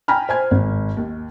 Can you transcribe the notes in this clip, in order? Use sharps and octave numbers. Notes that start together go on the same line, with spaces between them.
G5 G#5 A#5 B5 F6
C5 G#5 G#6
G#1
D#2